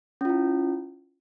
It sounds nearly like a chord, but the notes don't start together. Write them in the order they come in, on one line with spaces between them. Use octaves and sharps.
C#4 F4 E4